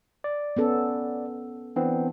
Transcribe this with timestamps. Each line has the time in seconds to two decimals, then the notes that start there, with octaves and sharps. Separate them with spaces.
0.24 D5
0.57 B3 C#4 A4
1.76 E3 B3 C4 D4